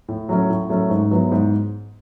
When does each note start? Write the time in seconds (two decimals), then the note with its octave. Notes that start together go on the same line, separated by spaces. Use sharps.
0.08 A2
0.29 F#3 A3 C#4
0.50 A2
0.69 F#3 A3 C#4
0.90 G#2
1.11 F#3 B3 E4
1.32 G#2